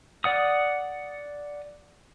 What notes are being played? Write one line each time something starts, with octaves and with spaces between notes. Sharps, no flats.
D5 F#5 D#6